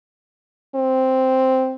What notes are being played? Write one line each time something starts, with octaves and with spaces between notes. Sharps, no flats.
C4